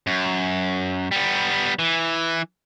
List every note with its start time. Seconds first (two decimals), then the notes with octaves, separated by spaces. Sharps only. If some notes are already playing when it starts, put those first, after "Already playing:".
0.07 F#2
1.11 G3 B3
1.79 E3